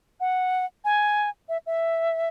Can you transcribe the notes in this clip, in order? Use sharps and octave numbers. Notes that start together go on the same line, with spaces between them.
F#5
G#5
E5
E5